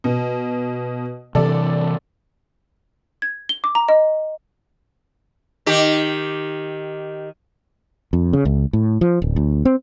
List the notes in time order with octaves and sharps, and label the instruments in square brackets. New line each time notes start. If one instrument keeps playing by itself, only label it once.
[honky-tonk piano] B2
[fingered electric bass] C3 E3 C4 [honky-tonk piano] A4 D5
[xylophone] G#6
G7
D6
A#5
D#5
[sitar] D#3 G4
[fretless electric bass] F2
C#3
C#2
A2
F3
D1
D2
C4